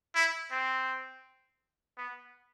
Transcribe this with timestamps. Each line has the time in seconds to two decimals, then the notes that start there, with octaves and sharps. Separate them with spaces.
0.15 E4
0.51 C4
1.97 B3